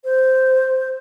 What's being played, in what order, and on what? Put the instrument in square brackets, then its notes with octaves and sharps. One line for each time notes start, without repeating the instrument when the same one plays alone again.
[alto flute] C5